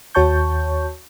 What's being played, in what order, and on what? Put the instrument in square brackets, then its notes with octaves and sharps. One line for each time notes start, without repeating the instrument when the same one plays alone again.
[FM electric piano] D#2 F#4 C#5 A5 C#6 G6